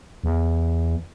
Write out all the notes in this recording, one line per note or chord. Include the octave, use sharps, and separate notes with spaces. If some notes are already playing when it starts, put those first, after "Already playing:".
E2